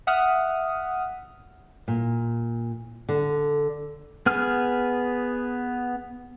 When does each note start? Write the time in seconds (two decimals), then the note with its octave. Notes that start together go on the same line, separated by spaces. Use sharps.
0.07 E5 F#5 D#6 F6
1.88 A#2
3.09 D3
4.26 B3 G#4 F6